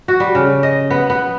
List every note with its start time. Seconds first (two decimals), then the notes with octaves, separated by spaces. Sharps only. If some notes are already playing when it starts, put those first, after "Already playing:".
0.08 F#4
0.20 G3
0.35 C#3
0.63 D#5
0.90 B3
1.10 B3